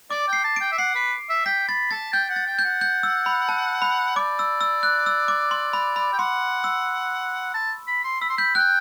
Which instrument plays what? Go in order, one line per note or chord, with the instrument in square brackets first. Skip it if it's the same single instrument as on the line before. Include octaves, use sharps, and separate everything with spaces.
[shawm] D5 [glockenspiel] D6
[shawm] G5 [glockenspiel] C7
[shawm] A5
[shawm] G5 [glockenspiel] D7
[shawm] E5
[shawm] F#5 [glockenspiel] C7
[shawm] B4
E5
[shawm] G5 [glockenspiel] B6
[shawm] B5 [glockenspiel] A6
[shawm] A5 [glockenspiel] A6
[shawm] G5 [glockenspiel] G6
[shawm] F#5
[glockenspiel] A6
[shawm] G5
[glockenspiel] G6
[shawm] F#5
[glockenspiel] G6
E6
B5
A5
B5
[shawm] D5 [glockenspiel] D6
[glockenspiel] E6
E6
F#6
E6
D6
C6
B5
B5
[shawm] G5
[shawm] F#5 [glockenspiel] C6
[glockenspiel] E6
[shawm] A5
B5
C6
[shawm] B5 [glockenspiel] E6
[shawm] C6
[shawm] B5 [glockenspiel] G6
[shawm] G5 [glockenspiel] F#6